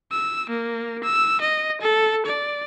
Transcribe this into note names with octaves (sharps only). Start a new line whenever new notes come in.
E6
A#3
E6
D#5
A4
D5